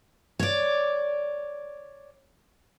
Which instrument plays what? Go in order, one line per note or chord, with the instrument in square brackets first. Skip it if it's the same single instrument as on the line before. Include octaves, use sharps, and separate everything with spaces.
[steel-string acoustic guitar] C#5 D5